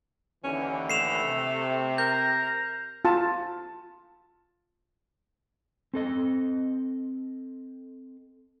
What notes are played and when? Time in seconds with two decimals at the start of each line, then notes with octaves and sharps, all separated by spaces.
0.44 D#2 D3 E3 C#4
0.90 A3 C7 E7 F7
1.25 C3
1.98 A#4 A#5 G6
3.05 F4 A5
5.94 C4 A4 D#5